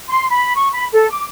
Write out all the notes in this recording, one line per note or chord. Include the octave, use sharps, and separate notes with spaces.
C6
B5
C#6
B5
A4
D6